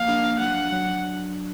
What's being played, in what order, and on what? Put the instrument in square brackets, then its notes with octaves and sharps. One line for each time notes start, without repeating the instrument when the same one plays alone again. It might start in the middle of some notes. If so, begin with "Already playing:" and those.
Already playing: [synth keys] F3 A#3 [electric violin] F5
[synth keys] D4
[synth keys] F#3 [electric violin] F#5
[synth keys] F#3